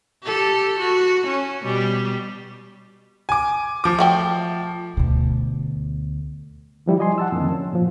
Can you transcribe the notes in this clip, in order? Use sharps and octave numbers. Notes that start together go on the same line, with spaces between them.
G4 A4
F#4
C#4
B2 G3
G#5 D6
F3 D6
A3 F#4 G5
D2 B2
D#3 F3 G3 E4
D5 D#5 G#5 C6
F#5 A5 E6
F2 A2 D3 D#3 A#3 C4
C#4
G2 A#2 F3